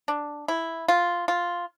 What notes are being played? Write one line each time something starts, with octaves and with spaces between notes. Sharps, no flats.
D4
E4
F4
F4